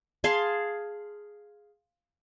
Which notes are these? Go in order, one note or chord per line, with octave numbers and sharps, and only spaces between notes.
G#4 F5 A5 C6